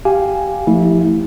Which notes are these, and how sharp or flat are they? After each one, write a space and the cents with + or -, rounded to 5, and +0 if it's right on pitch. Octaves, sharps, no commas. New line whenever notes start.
G4 -5 F5 +0 G#5 +0
F3 +0 A3 +25 E4 -30